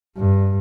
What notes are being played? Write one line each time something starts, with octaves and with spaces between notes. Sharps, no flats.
G2